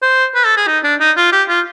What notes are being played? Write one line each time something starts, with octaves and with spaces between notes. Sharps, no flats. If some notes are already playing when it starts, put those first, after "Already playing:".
C5
B4
A4
G#4
D#4
D4
D#4
F4
G4
F4